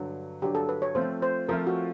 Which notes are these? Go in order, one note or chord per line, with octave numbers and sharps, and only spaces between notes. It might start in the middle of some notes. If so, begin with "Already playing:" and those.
Already playing: G2 D3 F#3
G2 D3 F#3 G4
A4
B4
C#5
F3 A3 C4 F4 C5
C5
F3 A3 C4 F4 A#4
F#4